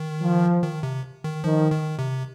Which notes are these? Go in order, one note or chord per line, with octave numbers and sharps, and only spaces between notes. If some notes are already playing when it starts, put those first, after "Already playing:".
Already playing: D#3
F3
D#3
C3
D#3
D#3 F3
D#3
C3